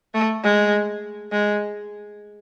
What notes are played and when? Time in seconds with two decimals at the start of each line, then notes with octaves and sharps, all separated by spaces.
0.14 A3
0.44 G#3
1.32 G#3